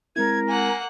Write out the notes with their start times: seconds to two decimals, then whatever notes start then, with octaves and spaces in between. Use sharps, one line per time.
0.16 G#3 C4 E4 A#4 G#6
0.48 A#3 F#5 G#5